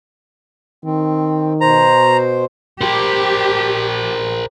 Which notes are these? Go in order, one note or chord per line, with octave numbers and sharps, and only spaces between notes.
D#3 C4
B2 C5 A#5
G4 A#4 C5